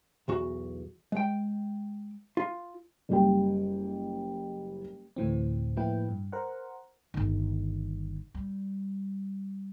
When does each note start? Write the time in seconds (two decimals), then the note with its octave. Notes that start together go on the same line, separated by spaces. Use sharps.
0.28 B1 E2 F#4
1.12 G#3 G5
2.37 F4
3.09 F#1 G3 G4 G5
5.16 D2 A2 E3 C4
5.77 A2 F3 A#3 E4 B4 G5
6.09 G2
6.32 A#4 C5 F#5
7.14 G1 D#3
8.35 G3